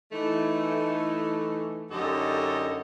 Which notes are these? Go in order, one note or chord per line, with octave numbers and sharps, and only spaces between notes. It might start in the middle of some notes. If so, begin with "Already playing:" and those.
E3 A3 D#4
F#2 D3 D#4 G4 A4 D#5